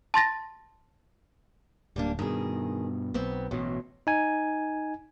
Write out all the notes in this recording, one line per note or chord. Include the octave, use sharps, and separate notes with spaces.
A5 C6 A6 A#6
D1 G3 A#3 D4
G2 B2 D#3 G#4
B1 B3 C4
A1 B2 F#3
D#4 G#5